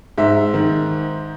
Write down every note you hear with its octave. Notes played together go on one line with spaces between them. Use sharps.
G#2 E5
D#3